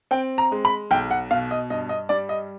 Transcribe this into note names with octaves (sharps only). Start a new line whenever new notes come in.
C4 G5
A#5
G#3
B5
B1 G5
F#5
B2 F5
D#5
G2 D#5
D#5
G3 D5
D#5